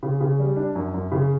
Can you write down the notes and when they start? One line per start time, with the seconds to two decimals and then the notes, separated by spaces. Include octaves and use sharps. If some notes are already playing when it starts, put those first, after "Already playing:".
0.03 C#3
0.21 C#3
0.39 G3
0.56 D4
0.75 F#2
0.94 F#2
1.12 C#3